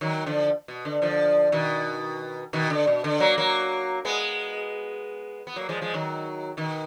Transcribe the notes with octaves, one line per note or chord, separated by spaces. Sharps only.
D#3 F#3
D3 F3
B2
D3
D3 F3
B2 D#3
B2 D#3
D3
B2
D3
F#3 A#3
F#3 A#3
G#3 B3
B3
F#3 A#3
F3 G#3
F3 G#3
D#3 F#3
B2 D#3